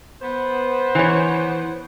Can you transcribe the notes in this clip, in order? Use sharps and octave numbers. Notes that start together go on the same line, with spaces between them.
B3 C5
E3 C#5